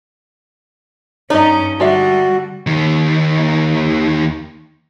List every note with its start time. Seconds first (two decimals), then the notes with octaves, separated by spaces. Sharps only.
1.30 G2 C#4 D#4 D5 D#5
1.80 D3 G3 G#3 F#4 D5 E5
2.67 D#2 D#3